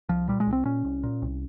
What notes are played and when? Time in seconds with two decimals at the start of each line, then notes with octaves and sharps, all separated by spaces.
0.09 C2 F3
0.28 A#2 G3
0.40 G#3
0.47 C2
0.53 C4
0.65 A#2 C#4
0.85 C2
1.03 A#2
1.22 C2